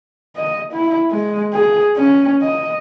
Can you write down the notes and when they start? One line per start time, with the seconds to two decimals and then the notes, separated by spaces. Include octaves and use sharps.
0.36 D#5
0.73 E4
1.11 G#3
1.53 G#4
1.97 C#4
2.42 D#5